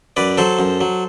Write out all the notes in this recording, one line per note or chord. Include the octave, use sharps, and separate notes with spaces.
F#2 B4 D5
F#3 A4 C5
F#2
F#3